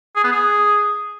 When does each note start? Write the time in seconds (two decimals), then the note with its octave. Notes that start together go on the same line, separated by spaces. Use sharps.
0.16 G#4
0.24 B3
0.32 G#4